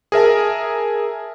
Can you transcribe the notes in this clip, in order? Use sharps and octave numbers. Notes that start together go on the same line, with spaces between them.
G#4 A#4 E5 A5